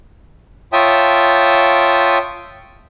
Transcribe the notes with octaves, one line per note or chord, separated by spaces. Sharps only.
F4 C#5 E5 G5 A5 D#6